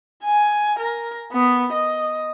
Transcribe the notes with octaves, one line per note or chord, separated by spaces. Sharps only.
G#5
A#4
B3
D#5